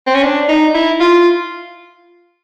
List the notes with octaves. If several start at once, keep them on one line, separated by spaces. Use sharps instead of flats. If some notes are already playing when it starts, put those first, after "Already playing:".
C4
C#4
D4
D#4
E4
F4